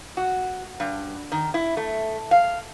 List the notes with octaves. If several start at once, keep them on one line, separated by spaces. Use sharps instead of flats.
F#4
G2
D#3
E4
A3
F5